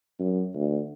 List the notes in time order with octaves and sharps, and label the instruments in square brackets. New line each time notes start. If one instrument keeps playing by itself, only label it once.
[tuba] F#2
D2